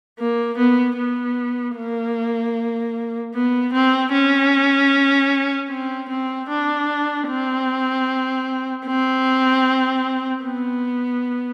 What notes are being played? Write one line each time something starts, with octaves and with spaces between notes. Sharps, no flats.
A#3
B3
B3
A#3
B3
C4
C#4
C4
C4
D4
C4
C4
B3